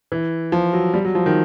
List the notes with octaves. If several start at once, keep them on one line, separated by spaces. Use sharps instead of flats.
E3
F3
F#3
G3
F#3
F3
D#3